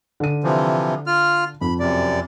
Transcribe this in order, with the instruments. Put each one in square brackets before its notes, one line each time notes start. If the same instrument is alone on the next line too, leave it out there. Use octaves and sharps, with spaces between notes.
[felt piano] D3 D#7
[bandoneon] C3 E3 F3
F4 F6
[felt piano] F2 [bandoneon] B5
[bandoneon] F#2 C3 D5